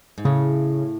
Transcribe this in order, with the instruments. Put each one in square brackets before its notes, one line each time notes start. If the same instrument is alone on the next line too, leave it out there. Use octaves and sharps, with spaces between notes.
[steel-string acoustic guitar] G#2
[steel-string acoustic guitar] A2 [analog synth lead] C#3